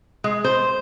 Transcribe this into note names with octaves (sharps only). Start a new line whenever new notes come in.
G#3
C5